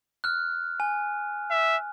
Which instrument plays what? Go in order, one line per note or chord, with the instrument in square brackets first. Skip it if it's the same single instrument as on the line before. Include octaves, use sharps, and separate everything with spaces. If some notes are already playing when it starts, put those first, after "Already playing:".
[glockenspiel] F6 F#6
G#5
[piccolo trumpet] E5